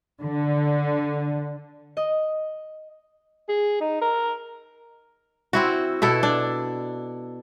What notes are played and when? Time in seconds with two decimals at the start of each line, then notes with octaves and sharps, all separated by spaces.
0.23 D3
1.97 D#5
3.49 G#4
3.81 D#4
4.01 A#4
5.53 C4 E4 F#4
6.02 B2 E4 A4
6.23 D4